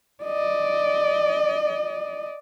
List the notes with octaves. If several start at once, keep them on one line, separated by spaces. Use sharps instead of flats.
D5 D#5